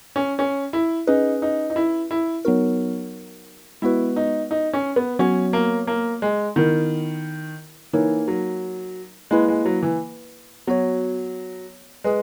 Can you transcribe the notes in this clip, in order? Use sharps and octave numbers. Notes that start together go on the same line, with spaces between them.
C#4
C#4
E4
C#4 D#4 G#4 B4
D#4
D#4
E4
E4
F#3 B3 D#4 F#4 A#4
G#3 B3 E4 F#4 B4
D#4
D#4
C#4
B3
F#3 B3 C#4 F#4 C#5
A#3
A#3
G#3
D#3 B3 E4 A#4
E3 A#3 D#4 A#4 C#5
F#3
G#3 A#3 E4 B4
G#3
F#3
E3
F#3 B3 F#4 C#5
G#3 G#4 B4